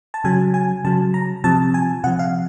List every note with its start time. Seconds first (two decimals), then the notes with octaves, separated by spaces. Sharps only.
0.14 A5
0.24 C#3 F#3 G#5
0.54 G#5
0.84 C#3 F#3 A5
1.14 A#5
1.44 C3 F3 A5
1.74 G#5
2.04 C3 F3 F#5
2.19 F5